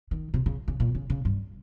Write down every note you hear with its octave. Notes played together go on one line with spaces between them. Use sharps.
D#3
C3
C#3
C#3
A#2
C#3
C#3
G2